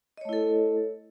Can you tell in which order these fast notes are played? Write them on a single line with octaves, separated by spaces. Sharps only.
D#5 C#5 A3 E4 A4